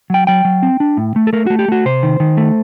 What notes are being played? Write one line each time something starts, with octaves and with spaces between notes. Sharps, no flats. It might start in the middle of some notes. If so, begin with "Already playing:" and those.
F#3 G5
F#3 G5
F#3
C4
D4
A2
A3
A4
A3 A#4
A3 F#4
G4
A3 F#4
C3 C5
D#3
D#3
A3